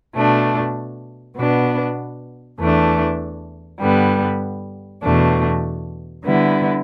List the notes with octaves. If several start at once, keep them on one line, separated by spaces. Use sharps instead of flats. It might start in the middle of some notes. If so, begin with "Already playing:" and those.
B2 A3 D4
B2 B3 D4
E2 E3 A3 D4
G2 D3 G3 B3
E2 B2 A3 D4
D3 G3 B3 E4